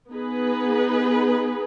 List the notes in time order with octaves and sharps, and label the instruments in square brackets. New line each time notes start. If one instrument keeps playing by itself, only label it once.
[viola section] B3 D#4 G#4 B4